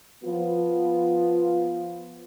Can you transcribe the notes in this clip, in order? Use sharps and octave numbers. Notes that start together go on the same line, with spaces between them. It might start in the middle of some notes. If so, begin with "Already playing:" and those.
F3 B3 F4